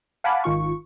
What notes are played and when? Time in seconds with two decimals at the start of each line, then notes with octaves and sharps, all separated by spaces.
0.24 F5 F#5 G#5 A5 B5 D6
0.44 G#1 D#3 F4 C#6